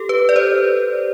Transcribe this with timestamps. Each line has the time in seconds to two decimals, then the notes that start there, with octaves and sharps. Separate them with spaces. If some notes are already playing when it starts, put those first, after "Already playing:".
Already playing: G4 A4
0.09 B4
0.29 D5
0.36 C5